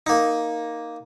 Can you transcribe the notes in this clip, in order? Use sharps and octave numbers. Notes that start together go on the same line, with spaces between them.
A#3 D#4